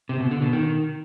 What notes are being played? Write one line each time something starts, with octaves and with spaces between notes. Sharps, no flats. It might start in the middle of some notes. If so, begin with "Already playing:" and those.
C3
B2
D3
B2
D#3